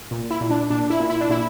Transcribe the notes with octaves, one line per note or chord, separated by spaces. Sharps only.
A#2
E4
A#2
D4
A#2 D4
E4
A#2
E4
D4
A#2 E4